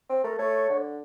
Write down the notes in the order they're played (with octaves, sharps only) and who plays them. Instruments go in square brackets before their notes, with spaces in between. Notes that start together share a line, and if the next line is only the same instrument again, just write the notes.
[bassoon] C4
[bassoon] A3 [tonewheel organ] A#4
[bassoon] A3 [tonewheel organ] C#5
[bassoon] D3